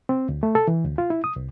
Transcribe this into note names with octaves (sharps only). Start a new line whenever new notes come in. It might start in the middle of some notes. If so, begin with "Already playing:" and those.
C4
D2
A3
A4
E3
D2
F4
E4
D#6
C2